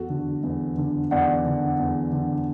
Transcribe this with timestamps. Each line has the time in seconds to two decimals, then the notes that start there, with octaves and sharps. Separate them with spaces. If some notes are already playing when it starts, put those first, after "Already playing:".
Already playing: E2 F#4 A4
0.10 D3
0.43 E2
0.78 D3
1.11 E2 D5 F#5
1.45 D3
1.79 E2
2.13 D3